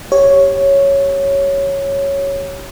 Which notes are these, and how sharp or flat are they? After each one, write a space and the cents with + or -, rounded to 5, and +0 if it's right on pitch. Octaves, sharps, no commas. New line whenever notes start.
G4 +0 C#5 +0